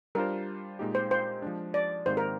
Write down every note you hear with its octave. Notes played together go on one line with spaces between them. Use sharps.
G3 D4 F4 A#4 C5
A#2 G#3 D#4 G4
C5
C5
F3 G#3 D4
D5
G#2 D#3 G#3 C4 G4 C5
A#4